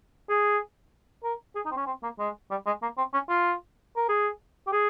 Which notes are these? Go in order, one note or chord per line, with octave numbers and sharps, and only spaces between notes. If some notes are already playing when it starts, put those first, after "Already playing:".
G#4
A#4
G#4
D#4
C4
C#4
C4
A#3
G#3
G3
G#3
A#3
C4
C#4
F4
A#4
G#4
G4
G#4